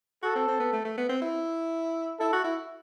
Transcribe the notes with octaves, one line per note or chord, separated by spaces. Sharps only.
F#4 A4
C4
C4
B3
A3
A3
B3
C4
E4
E4 A4
F#4
E4